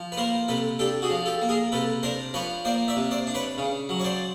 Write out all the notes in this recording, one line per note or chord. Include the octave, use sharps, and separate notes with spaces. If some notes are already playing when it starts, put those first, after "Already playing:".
Already playing: F3
B4
A#3 A#4 C5
C3 A4 B4
D4 G4 A4
F#4 G#4
F3
G4 A4
A#3
G#4 A#4
C3 A4 B4
D4 A#4 C5
F3 B4 C#5
A#3 C5 D5
D5 E5
C3
C5 D5
D4
B4 C#5
C#3
F#3
C#5
C5 D5